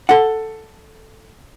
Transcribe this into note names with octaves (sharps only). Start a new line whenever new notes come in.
A4 F#5